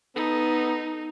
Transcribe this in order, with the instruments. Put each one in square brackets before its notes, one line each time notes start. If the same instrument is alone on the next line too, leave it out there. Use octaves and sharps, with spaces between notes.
[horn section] B3 A4 [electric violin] D#4